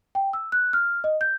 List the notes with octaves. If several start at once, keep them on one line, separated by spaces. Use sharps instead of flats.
G5
E6
F#6
F6
D#5
G6